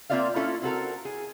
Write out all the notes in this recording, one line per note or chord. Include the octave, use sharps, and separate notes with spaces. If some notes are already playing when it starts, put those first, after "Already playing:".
A#3 C4 F4 D5 E5 F5
C#4 E4 F4 A4
C4 F#4 A4 A#4
G#4